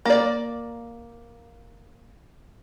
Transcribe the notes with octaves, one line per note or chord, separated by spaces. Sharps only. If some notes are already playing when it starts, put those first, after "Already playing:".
A#3 D5